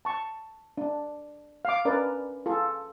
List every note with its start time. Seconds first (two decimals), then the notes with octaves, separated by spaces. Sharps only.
0.05 A5 C#6
0.78 D4
1.65 F5 D6
1.85 C#4 D4 A#4 B4 D5
2.46 F4 G#4 A4